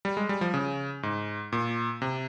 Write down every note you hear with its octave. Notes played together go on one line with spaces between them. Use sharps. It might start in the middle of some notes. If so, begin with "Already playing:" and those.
G3
G#3
G3
F3
C#3
G#2
A#2
C3